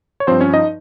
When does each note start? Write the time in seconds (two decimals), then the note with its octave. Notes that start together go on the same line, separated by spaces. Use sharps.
0.20 C#5
0.27 G2 F3 C4 C5
0.41 C#4 C#5
0.54 D#4 D#5